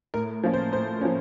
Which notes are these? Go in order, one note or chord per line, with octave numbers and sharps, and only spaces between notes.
A2 A#4
F3 A#3 C#4
C5
A2 C5
F3 A#3 C#4